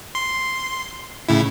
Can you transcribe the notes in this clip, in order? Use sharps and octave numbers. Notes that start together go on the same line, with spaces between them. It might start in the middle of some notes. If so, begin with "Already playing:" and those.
C6
A2 C#3 E4